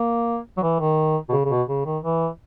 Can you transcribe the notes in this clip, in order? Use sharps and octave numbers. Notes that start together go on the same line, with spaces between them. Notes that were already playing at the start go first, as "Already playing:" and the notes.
Already playing: A#3
F#3
E3
D#3
B2
C#3
C#3
B2
C#3
D#3
E3